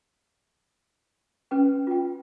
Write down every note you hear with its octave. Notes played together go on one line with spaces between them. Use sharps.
C#4 B4 G5
F4 G5